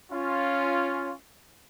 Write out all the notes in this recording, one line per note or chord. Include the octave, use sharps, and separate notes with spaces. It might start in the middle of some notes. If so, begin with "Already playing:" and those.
C#4 F4